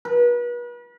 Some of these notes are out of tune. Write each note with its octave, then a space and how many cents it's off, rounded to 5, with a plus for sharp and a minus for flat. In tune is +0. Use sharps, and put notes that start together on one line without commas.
B4 -40